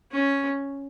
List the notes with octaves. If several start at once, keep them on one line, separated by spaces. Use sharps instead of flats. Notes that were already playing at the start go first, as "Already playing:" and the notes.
C#4